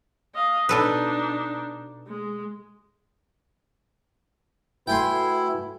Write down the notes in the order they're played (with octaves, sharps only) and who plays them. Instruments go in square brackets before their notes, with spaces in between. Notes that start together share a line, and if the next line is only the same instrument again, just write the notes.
[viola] D#5 F5
[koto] B2 A4 B4 [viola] D4 D#4
[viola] G#3
[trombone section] A3 B4 [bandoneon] E4 [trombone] F#4 [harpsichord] G5 G#5 C6